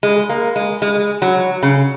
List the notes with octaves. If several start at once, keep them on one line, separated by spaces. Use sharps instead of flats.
G#3
A#3
G#3
G#3
F#3
C#3